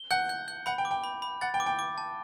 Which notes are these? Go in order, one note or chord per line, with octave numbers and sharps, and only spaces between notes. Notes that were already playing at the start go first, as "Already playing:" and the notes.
Already playing: G7
F#5 G6
G6
G6
F#5 B5
G5
D6
G5
B5
B5
F#5 A6
G5
D6
G5
D6
A5